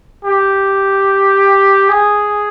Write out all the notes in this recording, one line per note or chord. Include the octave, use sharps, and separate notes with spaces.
G4
G#4